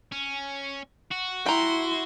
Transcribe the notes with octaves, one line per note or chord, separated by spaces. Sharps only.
C#4
F#4
E4 G5 A#5 C6